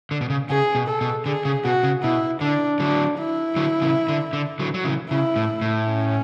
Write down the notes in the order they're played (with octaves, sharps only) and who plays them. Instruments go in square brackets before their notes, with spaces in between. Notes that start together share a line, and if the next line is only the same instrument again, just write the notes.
[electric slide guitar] D3
B2
C#3
[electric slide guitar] C#3 [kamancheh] G#4
[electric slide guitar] B2
[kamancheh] A4
[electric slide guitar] B2
[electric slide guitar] D3 [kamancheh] G#4
[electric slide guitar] C#3
[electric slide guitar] B2 [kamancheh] F#4
[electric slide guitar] C#3
[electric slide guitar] B2 [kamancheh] E4
[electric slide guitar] D3 [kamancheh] D4
[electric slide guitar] D3 F#3 [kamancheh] D4
[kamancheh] E4
[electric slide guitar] D3 F#3
C#3 E3
D3
D3
D3 F#3
F#3
C#3 E3
[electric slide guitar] C#3 [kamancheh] E4
[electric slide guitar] A2
A2
[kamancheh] C#4